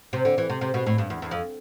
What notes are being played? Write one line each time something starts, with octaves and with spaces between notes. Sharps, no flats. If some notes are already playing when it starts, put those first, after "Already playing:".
C3
D3
E3
C3
C3
B2
A2
G2
E2
E2
F2